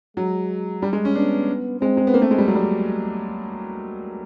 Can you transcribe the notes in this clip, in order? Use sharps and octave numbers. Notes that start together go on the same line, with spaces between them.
F#3 G#3
G3
G#3
C#4
B3 D4
G#3 C4
G#3
B3
A#3
A3
G#3
G3
F#3
G3